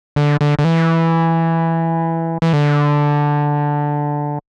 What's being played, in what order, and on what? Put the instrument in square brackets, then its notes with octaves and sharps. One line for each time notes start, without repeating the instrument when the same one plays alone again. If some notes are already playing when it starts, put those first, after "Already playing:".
[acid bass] D3
D3
D3
E3
E3
D3